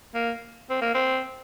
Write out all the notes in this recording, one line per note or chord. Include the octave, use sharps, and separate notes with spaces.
A#3
C4
A#3
C4